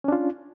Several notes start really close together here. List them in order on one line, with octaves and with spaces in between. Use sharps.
C#4 D4 F4